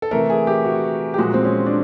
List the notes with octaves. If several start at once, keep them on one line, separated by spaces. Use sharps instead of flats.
A4
C3 E3 A3 A#4
G#4
G4
F#4
G4
A#2 F3 G#3 F#4
C4
C#4
D4